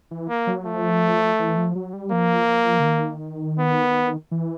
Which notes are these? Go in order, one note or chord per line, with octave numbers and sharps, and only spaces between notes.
E3
A#3
F#3
F3 A3
E3
F3
F#3
G3
F3 A#3
D3
D#3
B3
E3